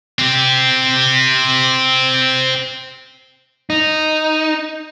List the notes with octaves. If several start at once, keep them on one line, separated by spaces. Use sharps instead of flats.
C4 G4
D#4